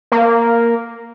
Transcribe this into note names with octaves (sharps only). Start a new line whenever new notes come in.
A#3